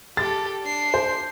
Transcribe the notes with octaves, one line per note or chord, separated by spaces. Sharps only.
G4 A4 A6
D4 C7
C5